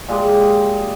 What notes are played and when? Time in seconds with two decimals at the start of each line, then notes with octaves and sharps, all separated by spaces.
0.08 A#2 G#3 G4